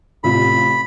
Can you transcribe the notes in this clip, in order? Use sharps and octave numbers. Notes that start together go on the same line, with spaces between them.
A1 C3 F4 B5